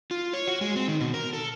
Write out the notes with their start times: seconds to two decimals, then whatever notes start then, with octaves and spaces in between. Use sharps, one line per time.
0.11 F4
0.33 C#5
0.47 F#4
0.61 G#3
0.76 C4
0.88 D#3
1.00 B2
1.14 A#4
1.33 A4